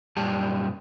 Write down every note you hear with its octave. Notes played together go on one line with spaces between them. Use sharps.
F#2 A#2 G3 G4 A5